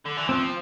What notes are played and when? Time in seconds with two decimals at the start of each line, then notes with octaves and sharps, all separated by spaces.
0.06 D3
0.17 E3
0.29 F3 C4